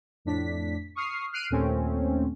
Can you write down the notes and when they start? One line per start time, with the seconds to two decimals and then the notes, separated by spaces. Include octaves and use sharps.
0.25 F2 A2 D4 B6
0.95 C#6 D#6 F6 C7
1.33 F6 F#6 C7 D7 D#7
1.50 D#2 A#2 A3 C4 C#4